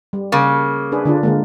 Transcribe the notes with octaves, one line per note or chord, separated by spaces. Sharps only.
G3
C#3 A#3
D4 G#4 B4
D3 D4 F4
D3 G#3 A#3